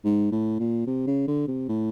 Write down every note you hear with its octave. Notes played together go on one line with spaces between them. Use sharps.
G#2
A2
A#2
C3
C#3
D3
C3
A2